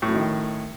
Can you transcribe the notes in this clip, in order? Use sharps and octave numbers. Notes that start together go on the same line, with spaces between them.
F#2 A2 D#3 F#3